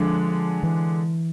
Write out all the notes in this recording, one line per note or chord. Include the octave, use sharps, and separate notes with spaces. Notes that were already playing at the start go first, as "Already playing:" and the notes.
Already playing: D3 F3 G#3 D4
E3